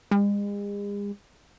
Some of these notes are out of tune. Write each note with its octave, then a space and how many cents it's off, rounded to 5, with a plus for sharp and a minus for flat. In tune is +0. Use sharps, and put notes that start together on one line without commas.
G#3 -40